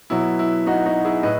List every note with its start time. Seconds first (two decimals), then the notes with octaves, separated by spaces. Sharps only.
0.10 B2 F#3 E4
0.39 E4
0.66 D#4 F#4
0.86 D#4 F#4
1.05 E4 G#4
1.23 A2 B4 D#5